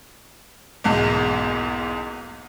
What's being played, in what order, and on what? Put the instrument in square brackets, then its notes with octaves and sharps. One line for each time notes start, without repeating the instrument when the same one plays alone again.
[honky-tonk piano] F#1 B1 E2 G#2